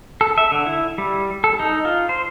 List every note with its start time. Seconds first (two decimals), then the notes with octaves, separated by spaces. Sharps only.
0.21 A4
0.38 E5
0.52 D3
0.67 E4
0.98 G3
1.44 A4
1.59 D#4
1.85 F4
2.09 C5